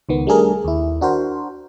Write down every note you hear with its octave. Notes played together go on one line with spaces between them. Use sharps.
C#2 D#3 B3
G3 A3 D4 G#4 A#4
D#2 E4
D4 F#4 A#4 C5